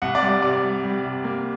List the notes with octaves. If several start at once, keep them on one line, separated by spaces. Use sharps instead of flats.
C2 F#5
D5
G3
D5
C3 D5
G3
G3
C3
A#3